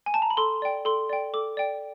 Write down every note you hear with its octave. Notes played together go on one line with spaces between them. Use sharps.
G#5
A5
A#5
B5
A4 C6
D5 G5
A4 C6
D5 G5
A4 D6
D5 G5